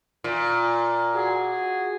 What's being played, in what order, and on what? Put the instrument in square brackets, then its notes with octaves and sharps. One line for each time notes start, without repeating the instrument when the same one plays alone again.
[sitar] A#2
[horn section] F#4 G#4